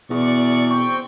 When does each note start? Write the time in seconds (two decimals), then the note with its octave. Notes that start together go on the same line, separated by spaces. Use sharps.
0.10 E2 B2 D5 C#6
0.70 C4 G5 C#6